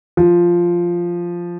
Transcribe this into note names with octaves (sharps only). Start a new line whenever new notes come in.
F3